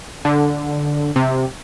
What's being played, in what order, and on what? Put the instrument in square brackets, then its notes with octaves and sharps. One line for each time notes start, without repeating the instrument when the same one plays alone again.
[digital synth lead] D3
C3